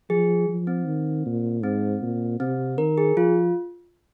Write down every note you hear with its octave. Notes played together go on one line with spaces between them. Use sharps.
F3 G#4
F3
C4
D#3
A#2
G#2 C4
A#2
C3 C4
D#3 A#4
G#4
F3 F4